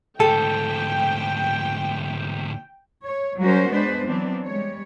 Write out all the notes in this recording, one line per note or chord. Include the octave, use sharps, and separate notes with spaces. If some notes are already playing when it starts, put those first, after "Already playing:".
D2 G#2 A4 G5
C#5
F#3 G3 C#4 F#4 A#4 C5
G#3 B3 D4 B4 C5
E3 F#3 B3 C4 D4
G3 G#3 C#5